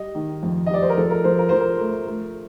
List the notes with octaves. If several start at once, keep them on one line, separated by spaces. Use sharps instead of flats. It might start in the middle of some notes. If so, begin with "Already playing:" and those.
Already playing: G3 D#5
D#3
F2
D#5
G3 D5
C5
A#4
F3 A4
A#4
F3 C5
A#4
F3 C5
A#4
A3
A3